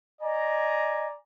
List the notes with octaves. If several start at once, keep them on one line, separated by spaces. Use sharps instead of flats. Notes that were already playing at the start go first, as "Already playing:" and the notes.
D5 D#5 G#5 A#5